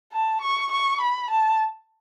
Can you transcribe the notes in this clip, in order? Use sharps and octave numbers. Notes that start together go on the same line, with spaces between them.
A5
C#6
C#6
B5
A5